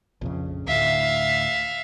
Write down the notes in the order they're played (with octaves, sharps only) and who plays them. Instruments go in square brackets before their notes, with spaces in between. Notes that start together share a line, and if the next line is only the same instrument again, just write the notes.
[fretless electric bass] A#1 F2 C#3
[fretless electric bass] D2 A2 [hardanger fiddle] E5 F5